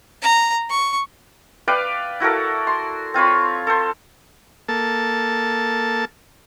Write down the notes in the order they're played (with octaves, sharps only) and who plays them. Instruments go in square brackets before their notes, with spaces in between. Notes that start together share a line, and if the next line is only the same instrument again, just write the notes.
[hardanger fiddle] A#5
C#6
[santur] B4 D5 F5 G5
E4 F#4 A4 A#4
C6
C4 F4 C#5 B5
A4 C5
[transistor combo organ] A#3 A4 A5